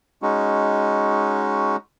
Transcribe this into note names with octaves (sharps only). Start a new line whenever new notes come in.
G#3 C#4 D#4 F#4